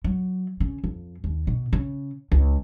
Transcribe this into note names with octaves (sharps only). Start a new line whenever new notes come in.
F#3
C#3
F2
D#2
B2
C#3
C#2